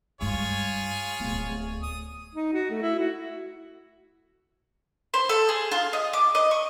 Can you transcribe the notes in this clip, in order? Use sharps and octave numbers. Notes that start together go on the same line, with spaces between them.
G2 G#3 F4 G#4 C#5
D1 B3
D#6
D#4
F#4
A3
E4
F#4
C5
A4
G#4
F4
D#5
D6
D#5
C#6